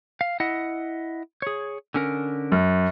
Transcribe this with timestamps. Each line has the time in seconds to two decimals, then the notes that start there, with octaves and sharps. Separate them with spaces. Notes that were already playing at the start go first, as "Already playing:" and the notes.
0.21 F5
0.40 E4 D#5 F#5
1.42 G#4 C#5
1.94 D3 C#4 A#4
2.52 F#2